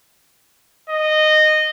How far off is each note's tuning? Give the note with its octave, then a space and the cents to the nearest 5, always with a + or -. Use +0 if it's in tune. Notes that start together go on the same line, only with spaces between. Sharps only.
D#5 -15